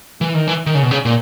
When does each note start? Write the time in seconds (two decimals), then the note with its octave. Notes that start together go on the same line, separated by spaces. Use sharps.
0.21 E3
0.35 D#3
0.48 E3
0.66 D#3
0.75 C#3
0.82 B2
0.91 C#3
1.05 A#2